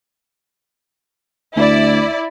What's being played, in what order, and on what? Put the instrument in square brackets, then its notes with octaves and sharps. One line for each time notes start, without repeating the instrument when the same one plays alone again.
[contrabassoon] D2 [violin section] E4 D5